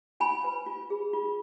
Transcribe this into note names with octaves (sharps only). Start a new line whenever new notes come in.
F4 G#5 B5
B4
F4
G#4
F4